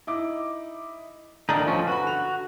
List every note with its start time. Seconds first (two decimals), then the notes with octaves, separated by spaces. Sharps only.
0.07 D#4 E4 D6
1.49 D#1 D2 D#3 D4 D#4 F#7
1.66 F3 C#4
1.87 F#4 B4 B5
2.04 D3 F7